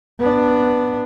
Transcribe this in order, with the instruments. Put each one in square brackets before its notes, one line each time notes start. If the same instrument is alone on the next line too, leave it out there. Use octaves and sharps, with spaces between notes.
[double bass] B3 D4